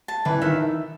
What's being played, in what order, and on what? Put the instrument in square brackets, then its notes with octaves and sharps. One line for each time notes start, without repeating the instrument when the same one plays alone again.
[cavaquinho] A5
[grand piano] E3 [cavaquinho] B4
[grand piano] D#3 [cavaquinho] E5